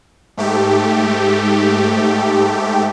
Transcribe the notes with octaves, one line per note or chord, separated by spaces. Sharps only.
G#2 A3 G4